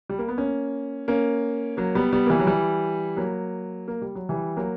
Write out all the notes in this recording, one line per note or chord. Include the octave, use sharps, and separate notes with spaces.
G3
A#3
B3
A#3 C#4
A#3 C#4
F#3 A#3
G3 B3
G3 B3
A#3
E3 G3
F#3
E3 G3
F#3 A#3
A#3
G3
F#3
E3 G3
F#3 A#3